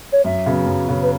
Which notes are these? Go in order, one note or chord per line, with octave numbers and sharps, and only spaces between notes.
C#5
F#2 E5
C#3 F#3 B3
F#2
C#3 F#3 B3
B4